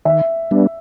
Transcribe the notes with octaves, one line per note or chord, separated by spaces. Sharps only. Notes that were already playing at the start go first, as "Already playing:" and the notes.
D#3 E5
G3 B3 D4